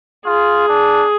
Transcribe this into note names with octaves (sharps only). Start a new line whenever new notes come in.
F4 G#4
D4